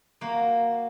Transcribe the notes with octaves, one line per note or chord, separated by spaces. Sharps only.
A#3 F#4